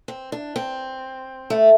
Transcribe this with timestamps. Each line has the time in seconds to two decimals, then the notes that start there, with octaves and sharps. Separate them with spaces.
0.08 C4
0.32 D4
0.56 C4
1.50 A3